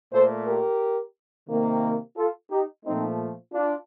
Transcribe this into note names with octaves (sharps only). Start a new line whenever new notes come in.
A#2 A3 A4 C5
G4 A#4
C3 D#3 A#3
F4 A4
D#4 G4
A#2 F3 A3 C4 D#4
D4 F4